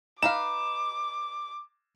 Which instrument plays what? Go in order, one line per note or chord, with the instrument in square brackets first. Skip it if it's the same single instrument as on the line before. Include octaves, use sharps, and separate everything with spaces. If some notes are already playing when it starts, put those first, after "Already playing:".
[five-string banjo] D#4 B4 F5 [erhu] D6 [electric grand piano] E7